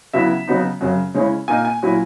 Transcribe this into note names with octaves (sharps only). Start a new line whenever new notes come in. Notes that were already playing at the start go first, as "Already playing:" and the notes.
C#3 F#3 B3 E4 E5
C#3 F#3 B3 D#4
F#2 C#3 F#3
C#3 G#3 C#4 E4
A#2 A#3 D#4 G#5
G#5
A#2 F#3 C#4 E4